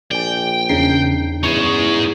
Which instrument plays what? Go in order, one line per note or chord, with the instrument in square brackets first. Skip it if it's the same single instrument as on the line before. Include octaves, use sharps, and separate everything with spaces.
[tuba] A#1 [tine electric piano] D5 G#5 [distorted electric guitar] G5
[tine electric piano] E2 D4 D#4 [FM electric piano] C#3 C7
[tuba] E2 [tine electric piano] C#4 E4 [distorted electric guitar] D#4 G#4 [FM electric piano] C#6